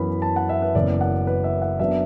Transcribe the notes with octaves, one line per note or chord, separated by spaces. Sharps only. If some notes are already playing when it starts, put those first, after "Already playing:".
Already playing: F#2 E3 B3 B5
A5
F#5
E5
B4
F#1 F#2 E3 B3 D5
F#5
B4
E5
F#5
F#2 F#3 B3 D4 E5